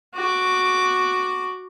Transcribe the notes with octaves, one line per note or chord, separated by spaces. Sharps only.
F#4 D6